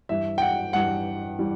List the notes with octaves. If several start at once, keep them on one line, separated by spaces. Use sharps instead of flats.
G2 E3 G3 E5
G5
F#5
G2 E3 G3 F#5
E3 G3